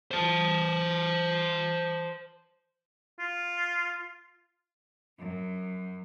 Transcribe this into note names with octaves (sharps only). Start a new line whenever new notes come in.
C5 A5
F4
F#2